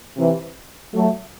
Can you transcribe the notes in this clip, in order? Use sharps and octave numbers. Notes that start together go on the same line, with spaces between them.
C3 E3
F#3 A3